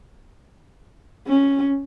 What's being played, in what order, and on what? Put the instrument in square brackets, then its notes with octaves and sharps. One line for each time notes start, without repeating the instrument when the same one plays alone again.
[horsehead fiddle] C#4